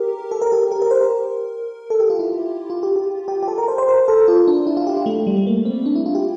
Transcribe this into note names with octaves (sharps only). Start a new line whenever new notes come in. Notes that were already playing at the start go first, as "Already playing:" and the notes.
Already playing: G4 A#4
A4
A#4
G4
G4
A#4
C5
A#4
A4
G4
F4
E4
F4
G4
G4
G4
G4
A4
A#4
C5
C5
A#4
A4
F4
D4
E4
F4
G4
F4
A3
G3
A3
A#3
C4
D4
E4
F4
G4